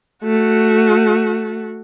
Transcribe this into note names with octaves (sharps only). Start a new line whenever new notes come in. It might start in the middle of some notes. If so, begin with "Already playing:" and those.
A3 F#4